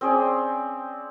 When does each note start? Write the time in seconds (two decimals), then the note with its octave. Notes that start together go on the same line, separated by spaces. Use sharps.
0.01 C4 C#4 G#4 D5